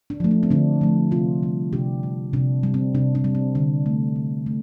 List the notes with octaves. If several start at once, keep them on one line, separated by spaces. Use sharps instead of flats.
D4
F3 A3
D4
C4
D3 D4
F3 A3
C3 C4 F4
G3
C3 D4 G4
G3
C3 D4
G3
C4
C3 D4
D4
G3
C4
D3 D4
A3
D3
A3